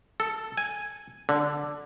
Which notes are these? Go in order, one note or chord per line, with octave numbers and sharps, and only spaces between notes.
A4
G#5
D3